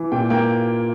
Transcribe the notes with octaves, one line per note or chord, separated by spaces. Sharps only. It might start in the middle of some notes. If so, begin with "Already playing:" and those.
Already playing: E3
A#2 G5
A#3 G5